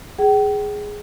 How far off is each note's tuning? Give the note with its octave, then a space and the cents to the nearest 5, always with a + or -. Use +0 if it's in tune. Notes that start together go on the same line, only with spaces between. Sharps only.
G#4 +0 G5 -40